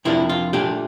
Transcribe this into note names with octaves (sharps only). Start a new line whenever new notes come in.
F2 C3 F3 A#3 D4 E4
F4
A#2 A3 D4 G4